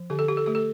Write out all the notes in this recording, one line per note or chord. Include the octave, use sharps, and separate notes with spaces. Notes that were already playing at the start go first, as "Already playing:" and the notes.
Already playing: F3
D3 G4
A4
G4
A4
A3 G4
A4